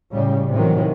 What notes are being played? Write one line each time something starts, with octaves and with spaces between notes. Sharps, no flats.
A2 C#3 G3
A2 C3 D#3 E3 F#3